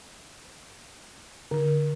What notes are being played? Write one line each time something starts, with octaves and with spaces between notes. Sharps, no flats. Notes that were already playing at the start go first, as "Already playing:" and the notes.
D3